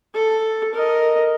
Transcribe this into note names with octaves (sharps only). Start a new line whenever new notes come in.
A4
A#4 D#5